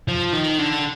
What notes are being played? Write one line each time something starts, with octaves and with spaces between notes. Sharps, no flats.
F3
D#3
D3